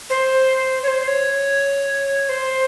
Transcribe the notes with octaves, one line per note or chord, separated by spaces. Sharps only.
C5
C#5
C5
C#5
C5